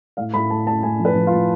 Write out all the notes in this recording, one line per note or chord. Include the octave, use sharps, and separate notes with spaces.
A2 F5
A2 B5
A2 A5
A2 A5
A2 G#5
F3
B4
F3
F4
A2